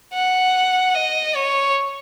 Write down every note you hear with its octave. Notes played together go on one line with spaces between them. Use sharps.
F#5
D#5
C#5